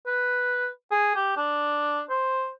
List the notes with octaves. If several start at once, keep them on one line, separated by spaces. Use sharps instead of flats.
B4
G#4
G4
D4
C5